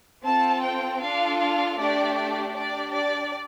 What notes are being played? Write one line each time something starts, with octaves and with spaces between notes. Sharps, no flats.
C4 F4 A4 A5
G5
D4 F4 A4 F5
F5
A3 D4 G4 D5
D5
D4 G4 D5
D5